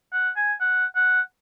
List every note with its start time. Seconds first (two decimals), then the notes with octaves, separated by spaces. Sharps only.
0.13 F#5
0.36 G#5
0.61 F#5
0.96 F#5